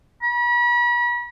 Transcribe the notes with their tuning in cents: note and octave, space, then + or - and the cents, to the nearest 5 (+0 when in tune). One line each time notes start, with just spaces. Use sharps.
B5 -40